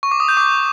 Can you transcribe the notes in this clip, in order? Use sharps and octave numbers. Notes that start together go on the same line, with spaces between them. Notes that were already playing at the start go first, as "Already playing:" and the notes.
C#6
D6
D#6
G6
D6